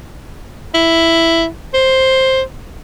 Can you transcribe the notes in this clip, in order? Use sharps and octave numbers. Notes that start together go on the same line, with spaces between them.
E4
C5